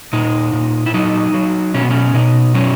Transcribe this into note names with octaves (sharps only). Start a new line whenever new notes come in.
A#2 D#4
A#2
E4
F#3 D#4
F#3
B2 C#4
B3
C#4
B2 D#4
F#3 C#4